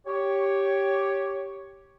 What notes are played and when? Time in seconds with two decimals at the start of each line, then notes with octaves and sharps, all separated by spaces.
0.07 G4 C#5